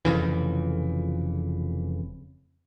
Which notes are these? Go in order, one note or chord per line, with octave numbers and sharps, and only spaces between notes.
F1 F2 C#3 E3